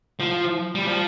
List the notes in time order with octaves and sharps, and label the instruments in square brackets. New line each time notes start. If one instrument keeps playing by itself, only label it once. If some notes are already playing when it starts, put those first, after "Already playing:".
[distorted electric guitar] F3
G3
F3